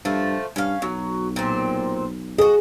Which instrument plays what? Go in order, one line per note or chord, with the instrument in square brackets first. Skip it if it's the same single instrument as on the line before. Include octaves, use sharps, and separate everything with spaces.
[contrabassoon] G2 [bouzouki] F3 A3
[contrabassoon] G2 [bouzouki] C#4 F5
[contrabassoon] B1 [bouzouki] F#3
[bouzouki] A#2 C4
[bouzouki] F#4 D#5 [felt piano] G#4